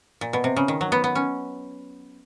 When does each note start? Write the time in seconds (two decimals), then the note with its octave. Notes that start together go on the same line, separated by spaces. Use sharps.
0.21 A#2
0.33 B2
0.44 C3
0.57 C#3
0.68 D#3
0.81 F#3
0.92 B3
1.04 B3
1.15 C#4